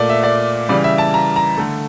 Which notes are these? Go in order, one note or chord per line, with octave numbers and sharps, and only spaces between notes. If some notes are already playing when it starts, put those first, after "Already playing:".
Already playing: A#2 A3 D5
E5
D5
C#3 E3 G3 D5
E5
A5
A#5
A#5
D3 A3